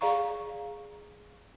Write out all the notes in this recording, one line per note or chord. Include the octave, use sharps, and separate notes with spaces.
G#4 D5 F5 A#5 C#6